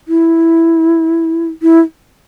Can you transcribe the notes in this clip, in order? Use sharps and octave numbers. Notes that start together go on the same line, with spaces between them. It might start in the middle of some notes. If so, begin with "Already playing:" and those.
E4
E4